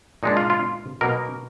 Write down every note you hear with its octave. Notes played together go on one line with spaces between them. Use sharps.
A#2 G#3 D4 D#4
F4
F4
B2 F#3 A#3 D#4 A#4